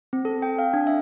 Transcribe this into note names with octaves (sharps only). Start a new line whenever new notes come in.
C4
A4
G5
F5
D4
E5